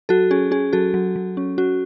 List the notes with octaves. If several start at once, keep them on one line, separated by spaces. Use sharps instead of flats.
F#3 F#4 A4
C#4 G#4
C#4 G#4
F#3 F#4 A4
F#3
F#3
C#4
C#4 F#4